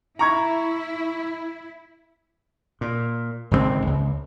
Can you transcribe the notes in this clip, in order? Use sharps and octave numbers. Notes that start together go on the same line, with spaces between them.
E4 A#5 C#6 G#6
A#2
G#1 C#2 C#3 C4
C#2